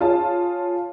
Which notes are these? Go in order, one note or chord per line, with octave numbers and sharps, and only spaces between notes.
F4 G#4 C#5 A5